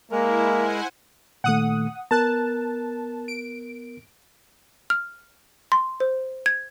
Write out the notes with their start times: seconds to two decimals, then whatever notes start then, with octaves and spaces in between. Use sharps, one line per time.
0.11 G#3 A#3 E4 A#4
0.55 C5 F#5 G#5
1.44 A#2 D#3 A3 F#5 D#6
2.11 B3 A#4 A5 F#6
3.28 D7
4.90 F6
5.72 C6
6.00 C5
6.46 G#6